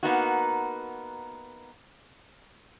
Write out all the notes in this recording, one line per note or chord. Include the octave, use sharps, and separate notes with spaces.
A#3 B3 D#4 F#4